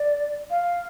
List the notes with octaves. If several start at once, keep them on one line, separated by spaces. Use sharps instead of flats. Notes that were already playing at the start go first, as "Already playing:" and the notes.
Already playing: D5
F5